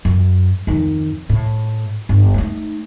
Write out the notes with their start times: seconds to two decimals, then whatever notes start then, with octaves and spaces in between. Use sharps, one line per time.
0.05 F#2
0.67 F2 D#3
1.29 A2
2.09 G1
2.34 A3 D#4